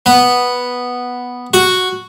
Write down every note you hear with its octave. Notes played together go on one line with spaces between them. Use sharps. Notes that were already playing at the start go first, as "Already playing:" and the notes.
B3
F#4